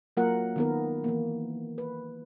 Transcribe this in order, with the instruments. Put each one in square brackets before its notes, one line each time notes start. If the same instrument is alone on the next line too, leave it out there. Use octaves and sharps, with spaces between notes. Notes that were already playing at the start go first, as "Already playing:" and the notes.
[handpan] F#3 A#3 F4 A#4 F#5
D#3 B3 A#4
E3 A#3
B4